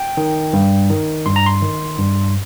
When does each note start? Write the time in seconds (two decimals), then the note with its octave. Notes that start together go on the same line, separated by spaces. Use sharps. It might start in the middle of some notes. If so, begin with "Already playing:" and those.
Already playing: G5
0.17 D#3
0.53 G2
0.90 D#3
1.26 G2 C6
1.36 A#5
1.46 C6
1.62 D#3
1.99 G2